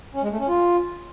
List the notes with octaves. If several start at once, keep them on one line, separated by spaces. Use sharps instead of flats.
C#4
G#3
A3
C#4
F4